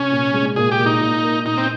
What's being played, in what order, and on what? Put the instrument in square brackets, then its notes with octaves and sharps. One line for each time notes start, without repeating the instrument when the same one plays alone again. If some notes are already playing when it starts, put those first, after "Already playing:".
Already playing: [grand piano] C3 [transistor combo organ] C#4
[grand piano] A#2
G#3
[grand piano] A#2 [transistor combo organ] G#4
[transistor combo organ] G4
[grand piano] A#2
[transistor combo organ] D#4
[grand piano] A#2
A#3
[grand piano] A#2 [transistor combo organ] D#4
[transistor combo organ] C4